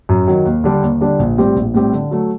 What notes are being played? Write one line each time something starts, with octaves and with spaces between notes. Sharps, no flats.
F#2
D#3 F#3
D#2
D3 G3 D4
D#2
D3 G3 D4
A#1
A2 G3 C4 G4
A#1
A2 G3 C4 G4
D3
F#3 A3